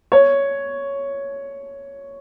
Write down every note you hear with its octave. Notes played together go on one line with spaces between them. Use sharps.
C#5